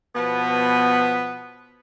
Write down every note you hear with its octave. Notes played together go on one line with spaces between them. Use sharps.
B2 F3 B3